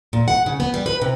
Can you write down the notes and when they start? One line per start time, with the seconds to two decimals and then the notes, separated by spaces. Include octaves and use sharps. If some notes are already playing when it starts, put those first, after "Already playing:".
0.13 A#2
0.28 F#5
0.46 C#3
0.60 B3
0.74 G3
0.86 B4
1.02 C3